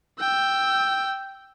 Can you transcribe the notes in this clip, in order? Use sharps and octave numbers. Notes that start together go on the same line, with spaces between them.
G5 E6